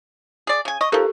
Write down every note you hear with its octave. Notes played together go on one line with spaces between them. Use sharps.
G#4 D5
C#3 G#5
D#5 C#6
F3 D#4 G4 A4 A#4